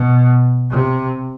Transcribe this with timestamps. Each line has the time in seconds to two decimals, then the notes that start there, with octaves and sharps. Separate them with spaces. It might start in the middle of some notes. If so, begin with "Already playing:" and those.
Already playing: B2
0.70 C3